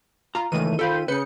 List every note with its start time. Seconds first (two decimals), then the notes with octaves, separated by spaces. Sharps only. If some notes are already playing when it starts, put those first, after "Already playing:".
0.35 F4 A#5
0.52 C#2 D#3 E3 A3 D#7
0.79 F4 A4 C5 F5 G5 B5
1.08 C#3 B4 G6 C#7